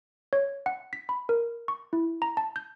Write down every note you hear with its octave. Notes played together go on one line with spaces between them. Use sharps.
C#5
F#5
B6
B5
A#4
C#6
E4
A#5
A5
G6